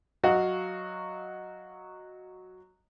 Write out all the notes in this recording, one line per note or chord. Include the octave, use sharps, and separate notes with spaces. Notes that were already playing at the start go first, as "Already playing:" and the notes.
F#3 F#4 D#5 F5